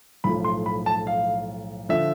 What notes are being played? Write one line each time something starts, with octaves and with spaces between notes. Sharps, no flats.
B1 A2 F3 A3 B5
C6
B5
A5
F5
D3 F3 E5